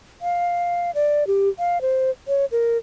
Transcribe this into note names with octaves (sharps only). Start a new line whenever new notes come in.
F5
D5
G4
F5
C5
C#5
A#4